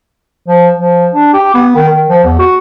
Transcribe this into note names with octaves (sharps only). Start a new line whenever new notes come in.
F3
F3
D4
G4
B3
D#3
D#3
F3
E2
F#4